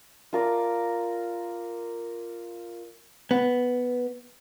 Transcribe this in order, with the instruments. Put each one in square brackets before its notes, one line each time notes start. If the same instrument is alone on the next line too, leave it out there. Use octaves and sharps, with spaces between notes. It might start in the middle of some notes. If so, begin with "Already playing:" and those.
[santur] F4 A#4 D5
[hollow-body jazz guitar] B3